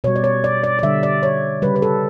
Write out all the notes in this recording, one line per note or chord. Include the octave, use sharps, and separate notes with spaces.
B2 G3 C#5
D5
C#5
D5
D5
D5
D3 G3 E5
D5
C#5
C#3 G3 B4
B4
A4